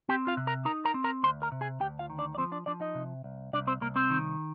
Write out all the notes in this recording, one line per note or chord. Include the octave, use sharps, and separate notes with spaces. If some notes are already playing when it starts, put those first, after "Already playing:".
C4 G4 G5
F4 F5
C3
A#4 A#5
D#4 A#4 A#5
A#4 A#5
C4
A#4 A#5
D2 C5 C6
A#4 A#5
C3
G#4 G#5
D2 G4 G5
F4 F5
D#3
D4 D5
D5
F3 C4 C5
D4 D5
F3 D4 D5
D#4 D#5
C3
C2
C2 D4 D5
C4 C5
C2 A#3 A#4
C4 C5
D#3